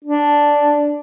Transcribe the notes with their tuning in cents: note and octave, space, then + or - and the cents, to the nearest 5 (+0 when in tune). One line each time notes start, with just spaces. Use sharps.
D4 -5